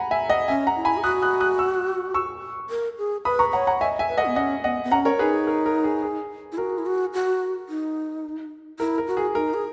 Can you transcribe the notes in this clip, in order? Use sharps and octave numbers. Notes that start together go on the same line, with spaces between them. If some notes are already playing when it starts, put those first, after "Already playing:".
Already playing: F#5 G#5 A#5 B5
E5 G#5
D#5 F#5
C#4 E5 G#5
F#5 A#5
E4
G#5 B5
G#4
F#4 D#6 F#6
D#6 F#6
D#6 F#6
C#6 E6
C#6 E6
A#4
G#4
B4 B5 D#6
A#5 C#6
C#5 F#5 A#5
F#5 A#5
D#5 E5 G#5
E5 G#5
B4
D#5 F#5
B3
C#4 D#5 F#5
B3 D#5 F#5
B3
C#4 F#5 A#5
A#4 C#5
D#4 G#4 B4
G#4
A#4
A#4
G#4
G#4
E4
F#4 A#4
E4
F#4
F#4
D#4
E4 A#4
A#4
F#4
G#4
D#4 A#4
G#4